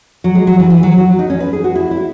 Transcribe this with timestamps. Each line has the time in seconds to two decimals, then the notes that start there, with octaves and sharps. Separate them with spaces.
0.24 F#3
0.35 G#3
0.47 F#3
0.60 E3
0.70 E3
0.83 F#3
0.98 F#3
1.19 D#4
1.30 C#4
1.40 B4
1.53 G#4
1.64 F#4
1.76 E4
1.91 E4